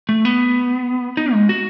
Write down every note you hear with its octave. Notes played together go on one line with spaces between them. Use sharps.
A3
B3
D#4
G#3
F#4